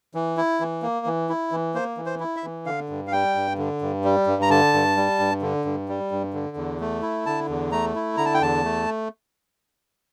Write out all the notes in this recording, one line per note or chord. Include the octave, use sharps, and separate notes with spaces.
E3
E4
E3
A#3
E3
E4
E3
A#3 C5
E3
C5
E4
E5
E3
D3 F5
G2
F5
G3 G5
G2
D3
G2
G3
G2
A#5
D3 A5
G2
G3
G2
D3
G2
G3
G2
D3
E2
A3
E4
D3 A5
E2
A3 A#5
E4
D3 A#5
A5
G5
E2 A5
A3